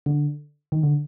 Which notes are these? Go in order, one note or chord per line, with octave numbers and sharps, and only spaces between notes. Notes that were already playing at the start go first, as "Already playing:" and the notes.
D3
D#3
D3